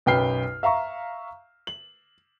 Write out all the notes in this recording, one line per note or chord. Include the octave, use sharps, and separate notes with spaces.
B1 F#2 B4 G5 F6 C7
E5 F5 A#5 C#6
F#7